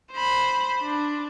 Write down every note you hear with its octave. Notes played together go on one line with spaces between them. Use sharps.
C5 B5
D4